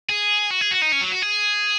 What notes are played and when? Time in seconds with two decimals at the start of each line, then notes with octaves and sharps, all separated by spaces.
0.09 G#4
0.51 F#4
0.61 G#4
0.71 F#4
0.82 D#4
0.92 C#4
1.01 F#3
1.12 F#4
1.22 G#4